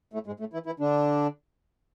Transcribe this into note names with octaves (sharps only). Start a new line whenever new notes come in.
A2 A3
G#2 G#3
A2 A3
E3 E4
E3 E4
D3 D4